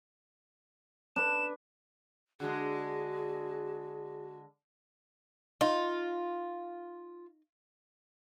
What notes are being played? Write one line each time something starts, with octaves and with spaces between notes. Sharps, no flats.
D4 B4 E7
D3 G#3 F#4 G#4
D#4 F4